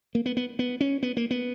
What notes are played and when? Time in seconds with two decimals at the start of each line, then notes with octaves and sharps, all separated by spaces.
0.15 A#3
0.26 B3
0.37 B3
0.59 B3
0.81 C#4
1.03 B3
1.17 A#3
1.31 B3